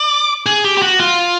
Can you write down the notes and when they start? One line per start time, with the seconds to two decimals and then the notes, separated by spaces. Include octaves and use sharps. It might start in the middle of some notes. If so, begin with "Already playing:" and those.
Already playing: D5
0.46 G#4
0.65 G4
0.77 G4
0.82 F#4
1.00 F4